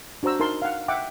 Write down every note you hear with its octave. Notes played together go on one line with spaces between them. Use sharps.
D4 F#4 C5 A#5 E6
D#4 A#4 A5 C6
F5 F#5
E5 F#5 G5 D6